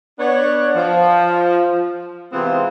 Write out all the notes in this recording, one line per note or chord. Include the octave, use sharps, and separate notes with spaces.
B3 D4 C#5
F3
C3 E3 G#3 B3 C4 F4